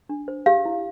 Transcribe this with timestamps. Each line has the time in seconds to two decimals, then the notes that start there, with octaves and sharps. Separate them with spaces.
0.09 D4
0.28 C5
0.46 G4 F5
0.65 E4